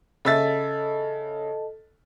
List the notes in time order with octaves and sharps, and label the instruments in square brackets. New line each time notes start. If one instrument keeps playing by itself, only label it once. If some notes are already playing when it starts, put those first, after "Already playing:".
[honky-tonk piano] C#3 E5 A6 [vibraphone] A4 D#5 A5